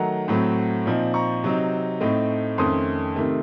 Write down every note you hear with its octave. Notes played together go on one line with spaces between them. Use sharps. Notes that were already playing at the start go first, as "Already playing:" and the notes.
Already playing: D#3 F#3 A3 D#4 F#5 A#5
A2 F#3 A3 C4
A#2 F3 C4 D#4
A#5 C#6
C3 F#3 C4 D#4
A2 A3 C4 D#4
F2 D#3 A3 C#4 C6 D#6
C3 D#3 A3